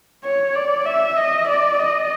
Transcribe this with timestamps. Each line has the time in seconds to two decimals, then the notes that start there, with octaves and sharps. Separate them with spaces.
0.24 C#5
0.55 D5
0.86 E5
1.17 D#5
1.47 D5
1.79 D#5